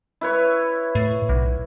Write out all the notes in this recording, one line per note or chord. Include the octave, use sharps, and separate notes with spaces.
E4 B4 C#5
A2
B1